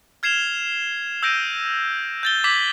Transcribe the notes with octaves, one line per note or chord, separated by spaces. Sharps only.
F6 G#6 C7 E7 F7 G7
E6 G6 A#6 D7 D#7
G6 A6 G7
D6 G#6 B6 F#7